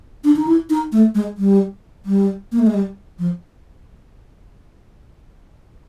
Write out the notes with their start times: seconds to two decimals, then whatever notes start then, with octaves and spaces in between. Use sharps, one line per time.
0.24 D4
0.36 D#4
0.47 E4
0.70 D#4
0.92 A3
1.15 G#3
1.38 G3
2.06 G3
2.52 A#3
2.59 A3
2.67 G#3
2.74 G3
3.19 F3